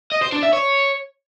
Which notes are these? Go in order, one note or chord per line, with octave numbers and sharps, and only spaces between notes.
D#5
C5
D4
E5
C#5